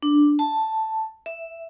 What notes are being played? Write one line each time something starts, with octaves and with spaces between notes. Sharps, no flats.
D4
A5
E5